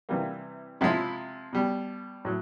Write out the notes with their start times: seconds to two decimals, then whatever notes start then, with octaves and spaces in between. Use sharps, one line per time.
0.09 C3 E3 G3 A#3
0.81 C3 F3 G#3 E4
1.53 B2 G3
2.25 A2 F#3